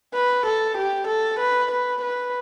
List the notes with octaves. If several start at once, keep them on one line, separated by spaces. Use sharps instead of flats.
B4
A4
G4
A4
B4
B4
B4